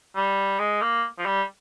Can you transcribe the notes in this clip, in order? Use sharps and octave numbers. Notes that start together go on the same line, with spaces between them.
G3
G#3
A#3
F3
G3